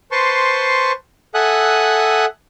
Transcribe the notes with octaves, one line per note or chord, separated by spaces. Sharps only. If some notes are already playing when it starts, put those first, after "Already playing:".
B4 C5 A5 C6 C#6
A4 E5 F#5 G#5 D#6 F#6